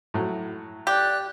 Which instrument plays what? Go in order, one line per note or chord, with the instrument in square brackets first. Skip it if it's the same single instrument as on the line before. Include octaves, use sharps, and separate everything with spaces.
[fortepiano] A2 F#3
[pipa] G4 [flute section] D5 F#6